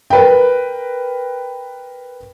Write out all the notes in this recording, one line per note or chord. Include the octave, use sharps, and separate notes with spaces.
A#4 B4 G5